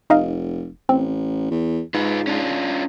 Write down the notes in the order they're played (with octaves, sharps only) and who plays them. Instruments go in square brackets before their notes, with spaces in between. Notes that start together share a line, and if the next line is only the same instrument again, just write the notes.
[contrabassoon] F1 [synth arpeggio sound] D#4 D#5 F5
[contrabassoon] A1 [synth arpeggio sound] C4
[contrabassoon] E2
[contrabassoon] G#2 [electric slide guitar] F4 B4
[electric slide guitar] C#4 D4 F4